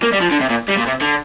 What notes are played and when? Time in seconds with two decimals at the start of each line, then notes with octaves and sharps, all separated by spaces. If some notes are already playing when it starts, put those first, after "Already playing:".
0.03 A#3
0.12 G3
0.21 F3
0.31 D3
0.41 C3
0.50 A#2
0.69 G3
0.78 A#2
0.87 C3
1.02 D3